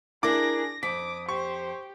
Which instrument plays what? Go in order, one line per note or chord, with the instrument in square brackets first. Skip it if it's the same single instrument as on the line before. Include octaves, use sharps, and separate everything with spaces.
[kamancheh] D4 G#4 [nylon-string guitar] E4 A#4 [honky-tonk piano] D6 [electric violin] A#6
[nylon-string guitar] F2 [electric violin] D6 [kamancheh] D#6 [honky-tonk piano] B6
[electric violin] G4 [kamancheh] C5 [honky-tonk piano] C#6